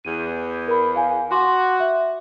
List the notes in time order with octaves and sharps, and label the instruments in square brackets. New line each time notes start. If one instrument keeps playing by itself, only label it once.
[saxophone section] E2 [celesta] D#7
[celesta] A#4 B5
F5 G#5
[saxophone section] F#4 [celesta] F#5 C6 D6
[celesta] E5